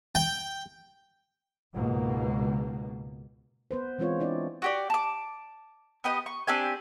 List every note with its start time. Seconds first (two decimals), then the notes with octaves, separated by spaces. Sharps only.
0.15 G5
1.74 C#2 G#2 B2 A#3
3.71 B3 B4 C5
3.99 E3 G#3 C4 F4 C#5
4.20 D4 E4 D5
4.62 F#4 G4 D5
4.90 A5 D6
6.04 B3 G4 D#5
6.26 C#6
6.47 C4 D4 G4 G#5